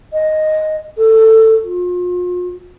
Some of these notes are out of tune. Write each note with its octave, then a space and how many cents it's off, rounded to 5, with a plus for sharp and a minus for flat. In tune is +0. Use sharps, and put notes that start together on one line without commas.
D#5 +0
A4 +15
F4 +40